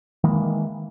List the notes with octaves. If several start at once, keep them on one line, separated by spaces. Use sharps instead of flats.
D#3 E3 G#3 A#3